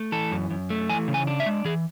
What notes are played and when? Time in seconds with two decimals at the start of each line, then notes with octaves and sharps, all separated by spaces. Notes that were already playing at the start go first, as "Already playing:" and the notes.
Already playing: A3
0.12 E3 A4
0.32 F#2
0.51 F#2
0.70 A3
0.89 E3 G#5
1.08 C#3
1.14 G#5
1.27 D4
1.40 E5
1.46 G#3
1.65 E3 G#4